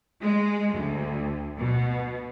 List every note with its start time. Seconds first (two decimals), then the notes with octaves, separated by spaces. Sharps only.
0.21 G#3
0.75 D2
1.59 B2